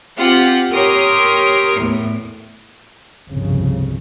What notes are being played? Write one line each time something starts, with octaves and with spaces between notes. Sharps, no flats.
C4 F4 G4 F#5
G4 A#4 C#5 C6 D#6
E2 A2
G1 C2 F2 C#3